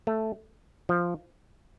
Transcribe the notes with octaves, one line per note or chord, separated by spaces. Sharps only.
A3
F3